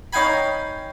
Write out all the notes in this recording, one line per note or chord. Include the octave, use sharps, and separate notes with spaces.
C#4 D#4 F5 G5 G#5 B5